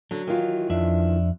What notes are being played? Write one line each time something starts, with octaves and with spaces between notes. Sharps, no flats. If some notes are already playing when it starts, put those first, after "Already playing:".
D3 F#3
D#3 E3 F4
F2 D4 E5